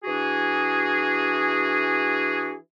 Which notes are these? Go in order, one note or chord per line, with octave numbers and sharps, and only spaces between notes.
E3 D4 F#4 G#4